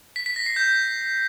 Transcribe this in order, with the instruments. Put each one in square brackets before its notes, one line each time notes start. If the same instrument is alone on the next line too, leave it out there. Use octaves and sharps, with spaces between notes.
[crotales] B6
B6
A#6
C7
G6